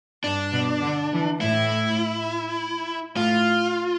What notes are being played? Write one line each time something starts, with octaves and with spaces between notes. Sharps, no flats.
G2 D4
B2
D3
E3
A2 E4
A2 F4